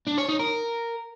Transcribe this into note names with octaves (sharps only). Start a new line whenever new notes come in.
D4
C#5
D#4
A#4